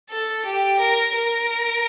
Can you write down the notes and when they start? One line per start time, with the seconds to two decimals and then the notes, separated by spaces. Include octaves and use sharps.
0.11 A4
0.46 G4
0.80 A#4
1.15 A#4